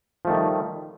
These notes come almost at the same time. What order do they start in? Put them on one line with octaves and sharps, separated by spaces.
F3 A3 D#3 G3